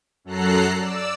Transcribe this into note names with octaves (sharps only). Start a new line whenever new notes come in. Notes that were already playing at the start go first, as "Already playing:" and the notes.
F#2 F#3 A4 A#5 F#6 C7
D5 E6